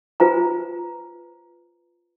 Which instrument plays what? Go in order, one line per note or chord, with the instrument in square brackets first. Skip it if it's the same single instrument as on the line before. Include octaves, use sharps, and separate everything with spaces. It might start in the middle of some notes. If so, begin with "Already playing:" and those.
[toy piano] F4 B4 C5 G#5 A#5